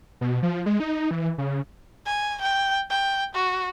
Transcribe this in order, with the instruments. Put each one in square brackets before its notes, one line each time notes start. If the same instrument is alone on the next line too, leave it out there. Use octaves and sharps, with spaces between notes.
[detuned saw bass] B2
F3
G#3
D#4
E3
C#3
[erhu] G#5
G5
G5
F#4